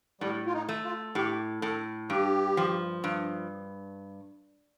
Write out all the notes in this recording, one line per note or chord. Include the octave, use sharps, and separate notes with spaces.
A2 G3
F4
D#4
A3
F4
A2 G4
A2 A4
G2 G4
F3
G2